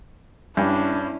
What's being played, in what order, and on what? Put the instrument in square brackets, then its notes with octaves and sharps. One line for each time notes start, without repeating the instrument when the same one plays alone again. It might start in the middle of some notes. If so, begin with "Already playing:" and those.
[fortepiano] G2 [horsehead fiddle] C#4 E4 [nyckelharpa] D4